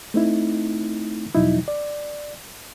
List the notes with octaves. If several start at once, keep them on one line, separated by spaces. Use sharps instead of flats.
A3 C4 D#4 E4
E2 B2 F3 F#3 D#4 E4
D5